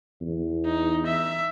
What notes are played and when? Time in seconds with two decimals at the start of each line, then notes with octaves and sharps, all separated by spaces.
0.21 E2
0.66 D#4
1.07 E5